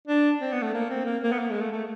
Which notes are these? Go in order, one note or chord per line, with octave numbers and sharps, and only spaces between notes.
D4
C4
B3
A3
A#3
C4
A#3
A#3
B3
A#3
G#3
A3
A3